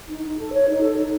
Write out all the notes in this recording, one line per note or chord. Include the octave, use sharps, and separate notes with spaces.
D#4
D#4
A4
C#5
D#4
A4
D#4